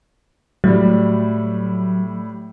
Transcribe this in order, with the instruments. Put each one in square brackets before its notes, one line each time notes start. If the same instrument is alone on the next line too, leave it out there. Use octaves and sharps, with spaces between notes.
[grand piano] A2 G3 [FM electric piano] F#3